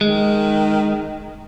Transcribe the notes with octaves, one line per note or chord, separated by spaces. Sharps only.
D#3 G#3